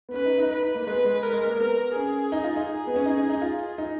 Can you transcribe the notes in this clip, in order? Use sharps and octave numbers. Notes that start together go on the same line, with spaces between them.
B3
C#4 B4
D#4
D#4
D#4 B4
D#4
A#3
G#3 B4
B3
G#3
A#4
G#3
A#3
B3 A#4
C#4 G#4
D#4
F4
D#4
G#4
B3
C#4
D#4
C#4
D#4
F4
D#4